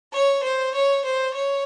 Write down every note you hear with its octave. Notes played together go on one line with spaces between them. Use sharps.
C#5
C5
C#5
C5
C#5